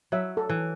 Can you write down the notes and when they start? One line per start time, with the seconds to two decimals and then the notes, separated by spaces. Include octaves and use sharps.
0.12 F#3 E5
0.37 A4
0.49 E3